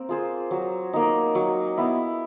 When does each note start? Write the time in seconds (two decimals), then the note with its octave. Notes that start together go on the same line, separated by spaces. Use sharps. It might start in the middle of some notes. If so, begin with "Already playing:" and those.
Already playing: A#3 C4
0.09 F4 G#4 C5
0.51 F#3
0.93 A#3 D#4
1.35 F#3
1.78 B3 E4